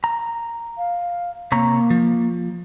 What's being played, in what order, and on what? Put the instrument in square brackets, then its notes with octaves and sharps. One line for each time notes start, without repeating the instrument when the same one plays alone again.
[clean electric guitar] A#5
[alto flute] F5
[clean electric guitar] C3 C#5 A#5 [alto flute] A#3
[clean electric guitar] F3